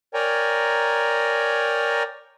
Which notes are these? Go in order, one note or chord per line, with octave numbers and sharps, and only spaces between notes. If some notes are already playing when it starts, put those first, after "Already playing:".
A#4 C#5 D5 G5 G#5 A#5